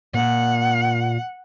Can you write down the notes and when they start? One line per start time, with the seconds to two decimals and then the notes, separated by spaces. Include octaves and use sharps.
0.14 A#2 F#5